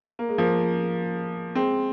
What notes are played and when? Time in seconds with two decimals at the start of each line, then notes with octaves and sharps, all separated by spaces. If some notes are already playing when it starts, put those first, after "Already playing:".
0.19 A#3
0.29 G#3
0.38 F3 A#3
1.55 G#3 C4